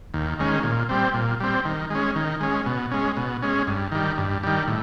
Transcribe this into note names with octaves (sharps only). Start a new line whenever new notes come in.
D#2
D#3 G#3 C#4
A#2
G3 C4
A#2
G3 C4
D#3
G#3 C#4
D#3
G#3 C#4
B2
G#3 C#4
B2
G#3 C#4
G2
D#3 G3
G2
D#3 G3
A2